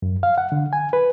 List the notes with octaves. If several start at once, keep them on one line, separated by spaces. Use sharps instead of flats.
F#2
F5
F#5
D3
G#5
B4